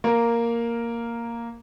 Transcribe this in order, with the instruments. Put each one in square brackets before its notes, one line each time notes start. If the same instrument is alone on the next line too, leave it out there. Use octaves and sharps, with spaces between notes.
[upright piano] A#3 A#4